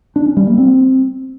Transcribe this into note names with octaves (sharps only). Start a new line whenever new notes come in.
D4
C#4
G3
A#3
C4